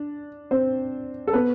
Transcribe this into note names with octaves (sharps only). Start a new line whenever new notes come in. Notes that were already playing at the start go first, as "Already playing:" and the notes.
Already playing: D4
C4 C5
A4
B3 B4